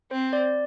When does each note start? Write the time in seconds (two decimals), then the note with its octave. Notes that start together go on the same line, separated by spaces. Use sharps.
0.11 C4 C5
0.33 D5